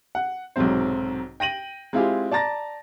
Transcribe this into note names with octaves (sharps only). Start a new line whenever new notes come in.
F#5
B1 G#2 C3 F#3 C4 C5
G5 A#6 D#7 F#7
G#3 C4 E4 F4 G4 G#4
D5 A5 A#5 A6 A#6